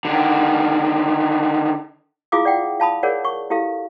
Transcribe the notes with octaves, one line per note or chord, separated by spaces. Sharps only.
D3 D#3
E4 F4 G#4 F5 D6 D#6
D5 F#5 G5
F5 A5 B5 D#6
G#4 A#4 C#5 D5 F#5
C#6
E4 G4 A4 F5